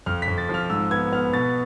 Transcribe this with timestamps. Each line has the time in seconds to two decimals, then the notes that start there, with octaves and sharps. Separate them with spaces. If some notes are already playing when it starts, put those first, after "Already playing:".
0.06 F2 F6
0.22 B6
0.28 F2
0.38 A6
0.49 F3
0.54 F6
0.70 G#2 E6
0.91 B3 G#6
1.12 B3 F6
1.33 B2 A6